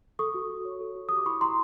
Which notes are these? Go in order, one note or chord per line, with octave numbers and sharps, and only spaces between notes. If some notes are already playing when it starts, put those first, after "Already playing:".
A4 C#6 D#6
F#4
F#4
C#5
A4
F#4
G4 D#6
D6
E4 B5 C#6
E4 A#5 C6